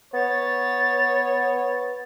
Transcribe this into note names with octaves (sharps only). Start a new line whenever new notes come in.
B3 C#5 A6